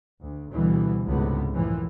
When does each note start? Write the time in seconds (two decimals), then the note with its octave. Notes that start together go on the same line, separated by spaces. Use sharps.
0.21 D2
0.51 D2 B2 E3 G3
1.06 C#2 G#2 C3 G#3 A3 B3
1.53 F#2 A2 E3 F3